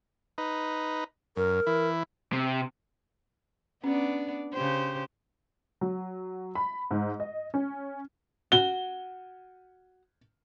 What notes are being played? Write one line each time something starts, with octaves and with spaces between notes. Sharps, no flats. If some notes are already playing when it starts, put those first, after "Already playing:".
D#4 B4
F#2 A#4
E3 E4
C3
B3 C#4 D4 D5
C#3 G4 C5
F#3
B5
G#2
D#5
C#4
F#4 G7